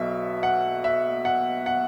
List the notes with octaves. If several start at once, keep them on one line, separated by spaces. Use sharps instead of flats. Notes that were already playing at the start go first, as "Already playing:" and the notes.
Already playing: B1 B2 F#3 E5
F#5
E5
F#5
F#5